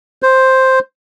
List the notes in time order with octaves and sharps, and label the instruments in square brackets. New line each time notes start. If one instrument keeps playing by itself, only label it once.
[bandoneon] C5